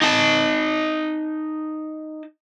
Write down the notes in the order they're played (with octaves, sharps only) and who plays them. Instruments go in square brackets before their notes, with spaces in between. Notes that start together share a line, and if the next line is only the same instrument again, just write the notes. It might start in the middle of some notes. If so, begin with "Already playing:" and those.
[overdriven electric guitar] D#4 A5